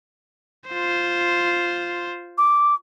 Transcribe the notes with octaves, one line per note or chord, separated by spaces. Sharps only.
F4 C5
D6